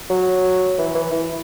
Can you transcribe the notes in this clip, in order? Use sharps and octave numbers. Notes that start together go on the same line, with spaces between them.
F#3
E3
E3
E3